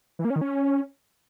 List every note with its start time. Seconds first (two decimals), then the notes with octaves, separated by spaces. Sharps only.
0.19 E3
0.25 A#3
0.30 C#4
0.36 D#3
0.41 C#4